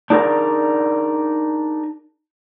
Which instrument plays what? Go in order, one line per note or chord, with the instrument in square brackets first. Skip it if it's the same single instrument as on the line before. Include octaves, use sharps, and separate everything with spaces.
[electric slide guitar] D4 D#4 G#4 A#4 D5